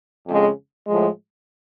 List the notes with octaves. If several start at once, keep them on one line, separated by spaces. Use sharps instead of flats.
F2 C#3 G#3
A2 F3 G#3